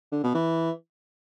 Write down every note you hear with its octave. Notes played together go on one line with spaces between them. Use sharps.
D3
B2
E3